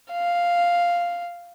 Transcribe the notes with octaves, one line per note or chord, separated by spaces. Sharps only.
F5